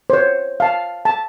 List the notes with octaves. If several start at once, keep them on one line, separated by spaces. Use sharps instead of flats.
C5 C#5
F5 A5
A5